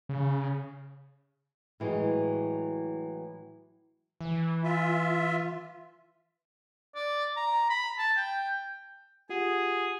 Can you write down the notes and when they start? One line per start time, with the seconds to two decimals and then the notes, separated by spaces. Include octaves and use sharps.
0.09 C#3
1.80 A2 E3 F#3 G#3
4.21 E3
4.64 F4 E5
6.95 D5
7.36 A#5
7.70 B5
7.98 A5
8.17 G5
9.29 F4 G4 G#4 F#5